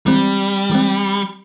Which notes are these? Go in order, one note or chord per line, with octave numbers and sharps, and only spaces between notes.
E3 G3 G#3 C4
E3 G#3 C4